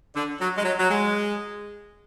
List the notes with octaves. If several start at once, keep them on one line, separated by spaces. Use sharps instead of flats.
D3
F#3
G#3
F#3
F#3
G#3